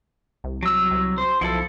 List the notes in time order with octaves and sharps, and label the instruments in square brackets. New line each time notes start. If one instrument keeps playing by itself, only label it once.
[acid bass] C2
[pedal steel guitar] F#3 E6
[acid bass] C2
[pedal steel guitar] C5
[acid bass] B1 [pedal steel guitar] F3 E4 A4